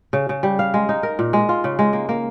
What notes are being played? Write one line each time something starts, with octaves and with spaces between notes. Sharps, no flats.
C#3
C#3
G3
F5
G#3
D#4
A#4
A#2
G#3
F4
C#3
G#3
A#3
A#3